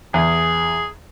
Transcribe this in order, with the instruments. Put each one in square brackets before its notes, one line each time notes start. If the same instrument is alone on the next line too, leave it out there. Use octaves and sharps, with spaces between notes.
[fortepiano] E2 [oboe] G#4